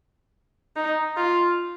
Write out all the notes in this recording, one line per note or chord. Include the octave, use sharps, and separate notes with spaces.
D#4
F4